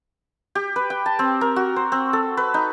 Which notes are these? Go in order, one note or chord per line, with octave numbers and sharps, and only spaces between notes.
G4
B4
G5
A5
C4
A#4
F#4
C5
C4
A4
B4
D#4